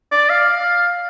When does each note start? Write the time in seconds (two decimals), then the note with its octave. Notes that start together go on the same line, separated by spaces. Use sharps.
0.11 D5
0.30 F5